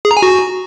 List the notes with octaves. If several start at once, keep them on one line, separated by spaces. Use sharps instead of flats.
G#4
A#5
G#5
F#4